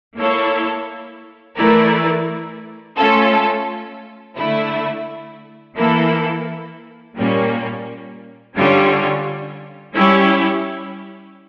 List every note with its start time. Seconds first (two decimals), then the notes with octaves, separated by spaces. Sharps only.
0.17 A#3 E4 A4 C#5
1.57 E3 A3 E4 A#4 D5
2.96 A3 C#4 F4 A4
4.37 D3 A3 E4
5.76 E3 A#3 E4 A4
7.16 A#2 G3 A#3 C#4
8.55 D3 G3 C#4 F4 C#5
9.95 G3 C#4 E4 G4 C#5